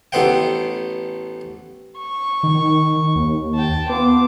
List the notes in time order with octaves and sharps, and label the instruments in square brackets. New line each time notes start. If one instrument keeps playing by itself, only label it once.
[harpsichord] A1 A3 B3 C5 F#5 G5
[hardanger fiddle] C#6
[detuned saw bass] D#3
D#2
[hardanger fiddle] G5 A5
[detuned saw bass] B3 [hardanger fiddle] F4 D6